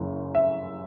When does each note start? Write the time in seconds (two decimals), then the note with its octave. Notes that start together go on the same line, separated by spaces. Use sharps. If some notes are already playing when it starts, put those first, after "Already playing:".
Already playing: F#1 F#2 C#3 E3
0.35 E5